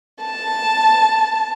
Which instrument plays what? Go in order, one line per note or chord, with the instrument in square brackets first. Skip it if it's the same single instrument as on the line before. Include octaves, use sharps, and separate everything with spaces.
[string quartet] A5